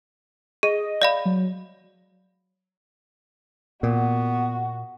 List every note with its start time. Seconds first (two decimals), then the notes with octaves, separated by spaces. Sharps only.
0.63 G#4 D#5
1.02 D5 F5 B5
1.25 F#3
3.83 A#2 B3 F#4